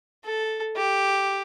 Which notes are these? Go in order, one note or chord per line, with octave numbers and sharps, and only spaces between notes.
A4
G4